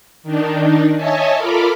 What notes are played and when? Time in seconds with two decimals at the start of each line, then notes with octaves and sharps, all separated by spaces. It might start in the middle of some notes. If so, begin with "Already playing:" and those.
0.23 D#3 D4 D#4
0.95 C#5 D#5 E5 G#5 A5
1.37 F4 A4 A#4 F5 B5 D6